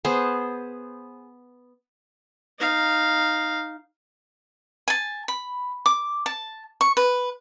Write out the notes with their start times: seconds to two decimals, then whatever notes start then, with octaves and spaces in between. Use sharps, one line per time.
0.05 B3 G#4 C5
2.59 D#4 F5
4.88 G#5 A5
5.28 B5
5.86 D6
6.26 A5
6.81 C#6
6.97 B4